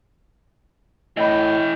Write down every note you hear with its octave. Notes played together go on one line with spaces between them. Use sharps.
A2 E3 D#5 G5 B5